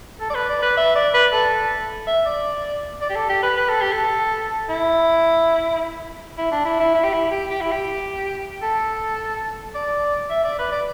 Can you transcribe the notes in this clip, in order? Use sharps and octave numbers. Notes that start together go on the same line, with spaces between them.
A4
D5
B4
D5
B4
E5
D5
B4
A4
E5
D5
D5
G4
A4
G4
B4
B4
A4
G4
A4
E4
E4
D4
E4
E4
E4
G4
E4
G4
G4
E4
G4
A4
D5
E5
D5
B4
D5